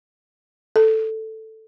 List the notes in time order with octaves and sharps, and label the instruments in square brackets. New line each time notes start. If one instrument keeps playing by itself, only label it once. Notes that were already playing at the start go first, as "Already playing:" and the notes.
[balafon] A4